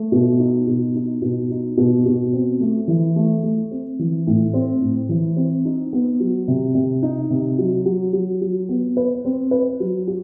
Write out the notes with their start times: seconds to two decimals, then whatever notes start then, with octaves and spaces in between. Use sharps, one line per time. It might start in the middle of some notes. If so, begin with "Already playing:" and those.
Already playing: A3
0.12 B2
0.39 D#4
0.67 B2
0.95 D#4
1.22 B2
1.50 D#4
1.77 B2
2.05 B2
2.33 C4
2.60 A3
2.88 E3
3.16 A3
3.43 A3
3.71 C4
3.99 E3
4.27 A2
4.54 C4
4.81 A2
5.09 E3
5.36 C4
5.65 D#4
5.93 B3
6.20 F#3
6.48 C3
6.75 C3
7.03 D#4
7.30 C3
7.58 F#3
7.86 F#3
8.13 F#3
8.41 F#3
8.69 B3
8.97 B4
9.25 C4
9.51 B4
9.80 F#3
10.07 F#4